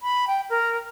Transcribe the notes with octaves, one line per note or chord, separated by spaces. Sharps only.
B5
G5
A#4